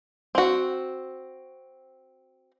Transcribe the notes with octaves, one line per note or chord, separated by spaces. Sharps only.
C4 F#4